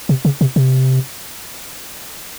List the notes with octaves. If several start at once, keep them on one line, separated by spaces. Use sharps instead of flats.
C3
C#3
C3
C3